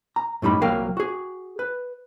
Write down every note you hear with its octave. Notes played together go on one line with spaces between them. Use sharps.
A#5
F#2 A2 G3 D#4 B5
C2 F#3 A#3 A#4 F5 G5
F#4 G#4
B4